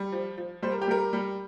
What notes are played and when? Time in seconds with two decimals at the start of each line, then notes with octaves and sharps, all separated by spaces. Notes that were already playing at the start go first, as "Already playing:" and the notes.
Already playing: G3
0.12 F3
0.38 F3
0.62 G3 C5
0.72 A#4
0.82 G4
0.88 G3 A#4
1.13 G3